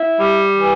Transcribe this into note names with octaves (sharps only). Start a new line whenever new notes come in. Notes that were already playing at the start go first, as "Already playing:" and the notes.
Already playing: E4
G3
E3